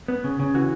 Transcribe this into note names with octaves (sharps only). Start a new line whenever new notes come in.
B3
C#3
C#3
E3 F#4